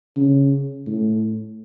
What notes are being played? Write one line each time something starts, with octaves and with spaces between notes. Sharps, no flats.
C#3
A2